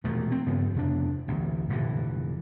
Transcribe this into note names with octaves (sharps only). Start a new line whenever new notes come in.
E1 D#2 A#2 A3
C4
G2 C#3 F3 B3
F2 C3 D4
A1 D2
F1 A#2 D3 E3